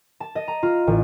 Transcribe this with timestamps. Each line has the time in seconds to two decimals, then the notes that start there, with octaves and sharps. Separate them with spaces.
0.20 A5
0.35 D#5
0.48 A#5
0.63 F4
0.87 A1